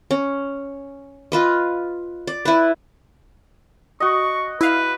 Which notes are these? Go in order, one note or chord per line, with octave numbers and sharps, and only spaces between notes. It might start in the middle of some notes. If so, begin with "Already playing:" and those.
C#4
F4 B4 D#5
D5
E4 B4
F#4 D#5 C#6
E4 B4 F5